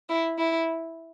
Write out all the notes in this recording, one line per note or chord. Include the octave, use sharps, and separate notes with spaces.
E4
E4